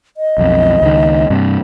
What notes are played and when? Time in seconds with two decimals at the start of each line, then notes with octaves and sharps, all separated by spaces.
0.17 D#5
0.38 B1 F2
0.82 C#2 D#3
1.30 G2 C3